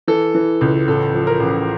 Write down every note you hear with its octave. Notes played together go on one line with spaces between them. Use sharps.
E3 A4
E3
C#2
A1 A4
F3
A#4
A1